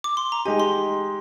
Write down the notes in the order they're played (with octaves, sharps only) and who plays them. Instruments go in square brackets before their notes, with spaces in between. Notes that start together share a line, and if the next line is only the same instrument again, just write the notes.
[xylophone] D6
C6
A#5
[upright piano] G#3 D#4 G4 [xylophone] G#5
[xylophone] C6